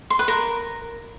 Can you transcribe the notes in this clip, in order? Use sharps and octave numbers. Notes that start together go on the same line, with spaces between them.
C6
B4
A#4